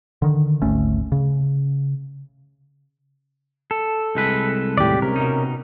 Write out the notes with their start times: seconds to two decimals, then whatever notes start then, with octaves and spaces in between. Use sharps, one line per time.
0.22 D3 D#3
0.62 G#1 D2 A3 C#4
1.12 C#3
3.71 A4
4.15 C2 G#3 B4
4.78 D#2 A2 G4 D5
5.02 C3 C#4 A#4
5.16 B2 D#4